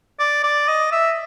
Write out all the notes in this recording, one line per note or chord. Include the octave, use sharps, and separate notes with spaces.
D5
D5
D#5
E5